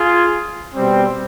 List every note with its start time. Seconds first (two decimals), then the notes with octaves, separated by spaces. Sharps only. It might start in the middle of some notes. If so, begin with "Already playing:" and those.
Already playing: F4 G#4
0.74 B2 G3 C4